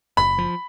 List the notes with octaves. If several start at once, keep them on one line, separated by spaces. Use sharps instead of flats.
F#1 B5
F3